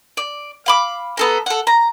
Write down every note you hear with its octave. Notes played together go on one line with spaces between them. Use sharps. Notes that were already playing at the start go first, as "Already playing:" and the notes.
D5
F5 B5 D6
B3 A4 A#5
A4 F#5
A#5